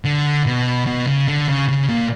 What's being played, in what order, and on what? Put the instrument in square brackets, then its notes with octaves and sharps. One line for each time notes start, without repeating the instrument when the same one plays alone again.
[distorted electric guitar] D3
B2
B2
C#3
D3
C#3
C#3
A#2